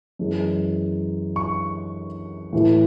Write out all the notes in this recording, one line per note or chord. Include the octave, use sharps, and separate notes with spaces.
F#2 E3 G#3
C#6
A2 E3 A3